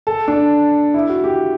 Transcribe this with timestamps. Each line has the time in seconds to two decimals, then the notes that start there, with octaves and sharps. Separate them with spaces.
0.07 A4
0.28 D4
0.94 E4
1.09 F#4
1.24 G4